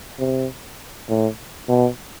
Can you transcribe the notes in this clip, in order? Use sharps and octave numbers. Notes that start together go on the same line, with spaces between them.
C3
A2
B2